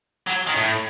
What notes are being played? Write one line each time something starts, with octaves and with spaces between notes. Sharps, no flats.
F#3
D#3
A2